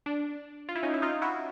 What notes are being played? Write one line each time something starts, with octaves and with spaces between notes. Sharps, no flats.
D4
F4
E4
C#4 D#4
E4
D#4 F4
E4 F#4